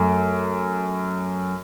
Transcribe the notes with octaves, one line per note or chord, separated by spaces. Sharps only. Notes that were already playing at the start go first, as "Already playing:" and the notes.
Already playing: F#2 A3